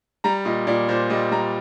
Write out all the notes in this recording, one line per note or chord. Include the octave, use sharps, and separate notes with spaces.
G3 A#5
A#2 D#5
A#2 D5
A#2 C5
G3 D#5
G3 A#5